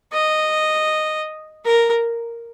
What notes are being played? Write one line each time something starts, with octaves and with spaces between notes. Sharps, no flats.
D#5
A#4